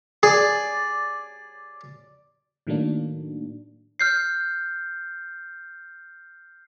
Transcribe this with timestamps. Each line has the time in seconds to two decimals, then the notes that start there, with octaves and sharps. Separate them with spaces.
0.23 G#4 D5
2.67 A2 D#3 F#3 A3 A#3 D4
4.00 F6 G6 C7